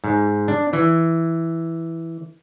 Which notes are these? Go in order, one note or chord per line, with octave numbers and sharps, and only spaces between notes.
G#2
D4
E3